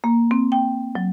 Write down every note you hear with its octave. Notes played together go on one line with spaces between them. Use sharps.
A#3
C4
G5
F#3